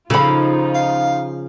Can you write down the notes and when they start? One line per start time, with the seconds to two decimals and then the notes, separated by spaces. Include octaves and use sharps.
0.10 C#3 F3 D#4 F4 A4 B5
0.75 F5